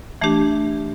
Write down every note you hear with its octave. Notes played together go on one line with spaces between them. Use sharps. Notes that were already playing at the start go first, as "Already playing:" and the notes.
E3 A3 D4 G4